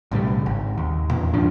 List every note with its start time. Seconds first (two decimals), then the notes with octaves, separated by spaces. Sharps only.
0.12 B1 A2 C#3 G3
0.46 G#1
0.78 D#2
1.11 E2 A#2
1.34 C#2 G#2 F3 D4